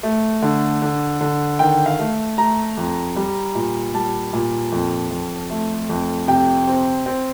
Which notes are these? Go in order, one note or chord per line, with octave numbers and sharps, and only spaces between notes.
A3
D3
D3
D3
D#3 G5
F5
A3
A3 A#5
F2
G3
A#2
G3 A5
A#2
F2
F2
A3
F2
C3 G5
C4
C4